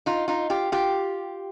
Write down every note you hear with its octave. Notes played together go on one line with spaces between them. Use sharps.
D#4 F4
D#4 F4
F4 G4
F4 G4